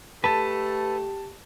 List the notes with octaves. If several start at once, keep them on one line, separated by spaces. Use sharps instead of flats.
A3 G4 A4 B4 A5